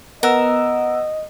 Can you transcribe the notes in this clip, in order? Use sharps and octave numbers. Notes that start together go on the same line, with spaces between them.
B3 A#4 D#5 F#5 E6